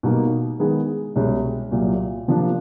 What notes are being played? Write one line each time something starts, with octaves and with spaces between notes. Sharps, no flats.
B2 G3 A#3 D#4
D#3 G#3 B3 D#4 G#4
C2 B2 G#3 C#4
C2 A#2 F#3
C3 F3 A#3 D4